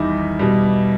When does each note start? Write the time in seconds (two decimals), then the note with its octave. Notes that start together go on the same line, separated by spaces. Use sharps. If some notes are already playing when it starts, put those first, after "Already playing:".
Already playing: E2 D#3 G3 D#4 E4
0.39 B2 G3